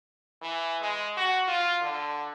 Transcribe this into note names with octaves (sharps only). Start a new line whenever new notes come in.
E3
G#3
F#4
F4
D3